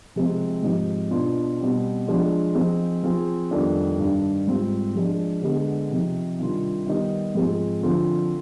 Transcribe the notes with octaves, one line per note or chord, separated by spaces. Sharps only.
C3 F3 G#3 C4
G#2 F3 C4 D#4 G4
B2 B3 D4 F4
B2 G3 C4 G4
F3 G#3 D4 F4
F3 C4 D#4 G#4
F3 C4 F4 G#4
F2 D#3 G3 B3 D4
G2 D#3 G3 D4
G#2 G3 C4 F4
F3 G#3 D4
D3 G#3 B3
C3 F3 C4 D#4
C3 D#3 G3 D4 F4
D#3 G3 B3 D#4 G4
G#2 F3 G#3 C4 F4
D3 F3 C4 F4